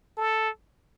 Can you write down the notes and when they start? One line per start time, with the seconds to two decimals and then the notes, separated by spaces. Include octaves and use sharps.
0.17 A4